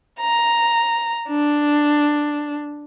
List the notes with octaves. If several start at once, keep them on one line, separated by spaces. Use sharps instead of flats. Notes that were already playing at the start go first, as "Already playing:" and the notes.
A#5
D4